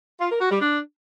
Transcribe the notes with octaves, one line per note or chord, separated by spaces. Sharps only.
F4
A#4
F#4
G3
D4